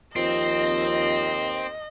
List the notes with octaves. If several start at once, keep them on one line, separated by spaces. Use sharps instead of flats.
D#2 F3 C4 D#5